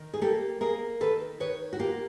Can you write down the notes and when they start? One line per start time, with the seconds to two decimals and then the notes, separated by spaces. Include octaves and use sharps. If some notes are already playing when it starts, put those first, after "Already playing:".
Already playing: D#3
0.13 G#4
0.22 A#3 G4 A4
0.61 A#3 G#4 A#4
1.00 D#3 A4 B4
1.40 D#3 B4 C#5
1.73 F#4
1.79 A#3 F4 G4